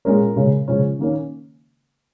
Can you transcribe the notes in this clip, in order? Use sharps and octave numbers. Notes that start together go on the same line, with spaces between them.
A#2 G#3 C#4 A#4
C#3 G#3 C#4
C#3 F3 G#3 C#4
D#3 A#3 C#4